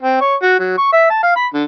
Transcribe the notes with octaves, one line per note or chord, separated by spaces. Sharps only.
C4
C#5
F#4
F#3
C#6
E5
A5
F5
B5
D3